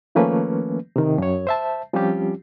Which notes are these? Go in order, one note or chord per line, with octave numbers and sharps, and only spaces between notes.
D#3 F3 A3 A#3 C#4 B4
C3 D#3
F#2 C#5
C5 E5 A5
F3 G3 C4 C#4 F4 G4